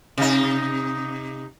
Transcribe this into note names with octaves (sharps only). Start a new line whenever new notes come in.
C3 D#4